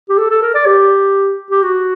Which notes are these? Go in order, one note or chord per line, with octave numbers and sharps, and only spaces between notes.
G4
A4
A4
A#4
D5
G4
G4
F#4